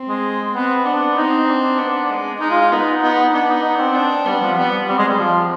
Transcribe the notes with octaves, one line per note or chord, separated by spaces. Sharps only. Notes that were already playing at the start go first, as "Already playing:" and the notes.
Already playing: C4
G#3
B3 C4
B3 D4
C4 D#4
D4
B3
G#3
G#3 D#4
F4
F4
B3 D#4
B3 D#4
B3 D4
D#4
D#4
D4
C4
D4
G3 B3
F3
G3 B3
G3 C4
G#3
G3
F3